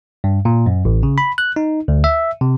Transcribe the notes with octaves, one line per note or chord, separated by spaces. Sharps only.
G2
A#2
F#2
A1
C#3
B5
F#6
D#4
D2
E5
C3